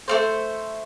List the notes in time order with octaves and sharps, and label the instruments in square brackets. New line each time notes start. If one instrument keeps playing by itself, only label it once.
[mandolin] A3 A#3 C5